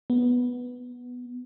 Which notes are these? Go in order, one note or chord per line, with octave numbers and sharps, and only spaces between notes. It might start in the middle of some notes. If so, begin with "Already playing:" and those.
B3